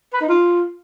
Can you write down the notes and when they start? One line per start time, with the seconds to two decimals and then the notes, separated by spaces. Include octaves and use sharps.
0.13 B4
0.21 D#4
0.29 F4